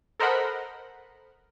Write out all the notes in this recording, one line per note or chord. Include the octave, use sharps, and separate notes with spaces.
A4 A#4 C5 D#5 F#5 B5